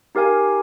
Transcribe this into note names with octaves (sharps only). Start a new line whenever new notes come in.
D#4 G4 A#4 F5 G#5